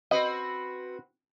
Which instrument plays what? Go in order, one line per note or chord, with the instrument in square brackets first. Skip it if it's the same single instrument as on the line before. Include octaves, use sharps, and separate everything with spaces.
[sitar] C4 F#4 B4 [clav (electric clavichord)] D#5